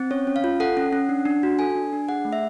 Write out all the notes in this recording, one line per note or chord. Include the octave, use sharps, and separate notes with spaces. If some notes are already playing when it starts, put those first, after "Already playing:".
Already playing: C4
C#4 C#5
C#4
F5
F4
A4 F#5
C#4
C#4
D4
D4
F#4
A4 G#5
D4
D4
G#4 F#5
A3
E5